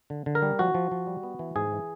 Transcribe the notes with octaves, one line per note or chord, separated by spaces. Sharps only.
D3
D3
A#4
G3
F3 F#4
F3
F3
G3
B3
E3
G#2 G#4
E3